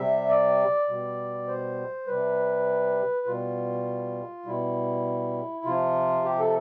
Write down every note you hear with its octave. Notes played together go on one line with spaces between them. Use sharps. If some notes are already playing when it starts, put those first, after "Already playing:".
Already playing: C3 G3 E5
D5
B2 G3
C5
C3 G3 B4
B2 G3 F4
B2 G3 E4
C3 F3 F4
G4
A4